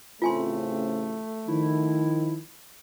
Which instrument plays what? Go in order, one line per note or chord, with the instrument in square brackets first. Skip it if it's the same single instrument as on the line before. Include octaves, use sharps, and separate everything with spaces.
[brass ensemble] A1 C#3 C4 [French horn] A3 [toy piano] F4 G#5 C6
[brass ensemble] D#3 F3 [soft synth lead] E4